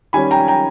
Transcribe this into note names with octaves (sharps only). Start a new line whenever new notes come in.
D#3 G3 C#4 G#5 B5
G5 A#5
G5 A#5